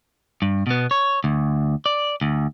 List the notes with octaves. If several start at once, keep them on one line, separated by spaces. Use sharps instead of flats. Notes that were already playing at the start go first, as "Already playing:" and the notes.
G2
B2 B3
C#5
D2
D5
D2